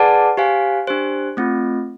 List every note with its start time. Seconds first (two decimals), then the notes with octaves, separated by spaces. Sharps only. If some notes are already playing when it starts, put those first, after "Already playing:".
Already playing: G#4 B4 D5 F#5 A5
0.37 G4 C5 F5 G#5
0.87 D4 G4 C5
1.37 A3 C4 F4